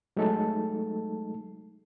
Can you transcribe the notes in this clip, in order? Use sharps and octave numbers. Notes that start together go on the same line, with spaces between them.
F#3 G#3 A3 D#4 A4 A5